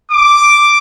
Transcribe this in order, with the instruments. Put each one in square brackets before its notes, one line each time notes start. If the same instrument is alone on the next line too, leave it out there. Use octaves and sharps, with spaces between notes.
[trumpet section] D6